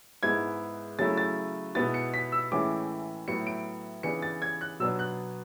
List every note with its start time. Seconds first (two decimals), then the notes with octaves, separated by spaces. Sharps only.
0.23 G#2 G#3 B3 E4 G#6
0.99 C#3 F#3 A3 E4 A6
1.17 A6
1.75 B2 G#3 B3 E4 A6
1.94 C#7
2.14 B6
2.32 E6
2.52 A2 E3 G#3 C#4 E4 D6
3.28 A2 F#3 B3 E4 C#7
3.47 D7
4.03 C#3 E3 B3 D4 C#7
4.22 A6
4.42 G#6
4.61 F#6
4.80 B2 F#3 B3 D4 E6
4.99 F#6